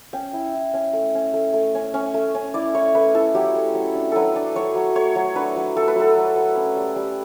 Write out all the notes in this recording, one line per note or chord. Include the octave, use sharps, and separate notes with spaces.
C#4 G5
E4
E4
C#4
A3
C#4
A3
A3
C#4
C#4
A3
C#4
E4 D5
E4 C#5
A3 B4
E4 A4
F#3 G4
A3
F#3
D4
F#3 A4 B4
D4
F#3 C#5
F#3
A3 C#5
F#3
D4 B4
F#3
A3 A4
B4
F#3 A4
F#3
F#3
C#4
G3
G3